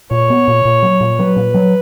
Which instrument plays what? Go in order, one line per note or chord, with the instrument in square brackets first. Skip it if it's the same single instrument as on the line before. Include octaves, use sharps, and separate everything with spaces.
[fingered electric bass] A#2 [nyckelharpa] C#5
[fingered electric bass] B3
A#2
A#2
F#3
A#2
[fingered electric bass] F#3 [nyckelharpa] B4
[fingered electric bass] A#2
F#3